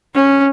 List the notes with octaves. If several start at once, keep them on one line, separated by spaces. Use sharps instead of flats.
C#4